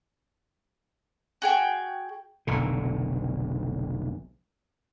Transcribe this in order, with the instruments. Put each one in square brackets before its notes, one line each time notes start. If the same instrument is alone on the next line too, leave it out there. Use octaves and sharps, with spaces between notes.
[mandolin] F#4 G#4 G5
[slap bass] F1 B1 D3